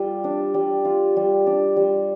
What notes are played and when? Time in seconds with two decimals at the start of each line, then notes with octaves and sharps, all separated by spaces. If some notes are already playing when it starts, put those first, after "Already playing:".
Already playing: G3 F4
0.24 D4
0.54 G3
0.85 F4
1.17 G3
1.47 D4
1.77 G3